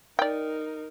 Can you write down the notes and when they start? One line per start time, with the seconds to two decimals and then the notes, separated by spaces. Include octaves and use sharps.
0.19 D#4 A#4 D5 G5